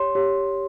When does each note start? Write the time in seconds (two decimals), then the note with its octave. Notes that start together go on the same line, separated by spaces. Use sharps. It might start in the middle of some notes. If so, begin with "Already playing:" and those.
Already playing: G4 C#5 C6
0.15 G4 C#5